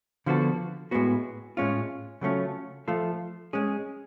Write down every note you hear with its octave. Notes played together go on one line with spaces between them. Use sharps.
D3 F3 B3 F#4 A4
A2 G#3 B3 F#4
A2 G#3 C#4 F4
C#3 F#3 A3 C#4 F4
F3 A3 F4 A4
G#3 C#4 G#4